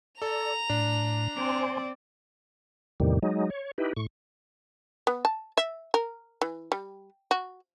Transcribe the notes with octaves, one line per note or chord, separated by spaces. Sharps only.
A4 D5 A#5 F7
A2 D4
C4 C5 D5 G#5 C6
E2 A2 C3 D#3 G3
F#3 G#3 D#4
C#5
D#4 E4 G4 B4
A2 C#6
B3
A5
E5
A#4
E3
G3
F#4